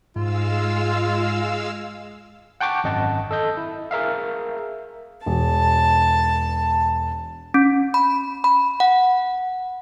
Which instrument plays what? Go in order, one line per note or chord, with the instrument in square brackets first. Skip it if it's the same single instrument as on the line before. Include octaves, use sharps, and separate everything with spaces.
[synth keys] G#2 [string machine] G#3 F5 E6 [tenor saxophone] F4
[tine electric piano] F#5 G5 A5 C#6 D6
G#1 F#2 D#5 F#5 A5
A4 D#5 G6
E4
G#4 A#4 E5 F5
[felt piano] E1 [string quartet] A5
[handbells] C#4
B5
B5
F#5